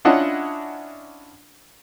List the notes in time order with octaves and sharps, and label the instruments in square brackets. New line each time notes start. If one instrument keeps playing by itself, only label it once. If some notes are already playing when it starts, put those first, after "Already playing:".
[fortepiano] C#4 D4 E4 F4 D#5 F#5